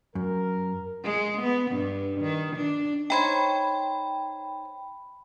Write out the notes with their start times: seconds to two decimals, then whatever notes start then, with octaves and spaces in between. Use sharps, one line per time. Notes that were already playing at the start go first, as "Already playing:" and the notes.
0.15 F#2 A#4
1.04 G#3
1.42 B3
1.72 G2
2.21 D#3
2.57 D4
3.10 D#4 C5 C#5 G5 B5